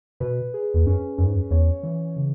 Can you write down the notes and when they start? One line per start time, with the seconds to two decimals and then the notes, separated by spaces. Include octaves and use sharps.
0.20 B2 B4
0.54 G#4
0.74 E2
0.86 F#2 C#4
1.18 F#2 C#4
1.26 G#2
1.34 F#2
1.51 E2 C#5
1.83 E3
2.16 C#3